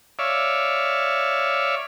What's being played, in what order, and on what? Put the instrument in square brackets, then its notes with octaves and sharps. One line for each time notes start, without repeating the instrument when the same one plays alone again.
[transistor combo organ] C#5 D5 E5 F5